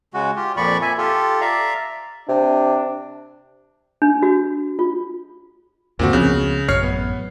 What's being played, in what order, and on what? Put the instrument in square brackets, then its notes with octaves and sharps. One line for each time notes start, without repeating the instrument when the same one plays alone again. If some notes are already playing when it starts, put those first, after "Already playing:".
[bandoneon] C#3 G#3 F#4
F4 G4
F2 A#2 F3 D5 B5 C#6
E5 G#5
F4 G4 A4
D5 E5 F5 A#5
[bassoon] C3 [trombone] D4
[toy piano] D4
F#4
F4
[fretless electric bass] E2 G2 D3 [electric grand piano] A#2 C4 F#4
[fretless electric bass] C#2 F3 B3 [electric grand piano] C#3 F#6
[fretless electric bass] A1 F#2 [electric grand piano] C#5 F6 C7
[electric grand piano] B3